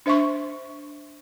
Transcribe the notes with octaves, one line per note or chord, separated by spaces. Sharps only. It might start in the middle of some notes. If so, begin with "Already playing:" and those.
D4 C5 E5 C6 C#6